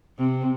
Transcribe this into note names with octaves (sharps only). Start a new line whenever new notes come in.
C3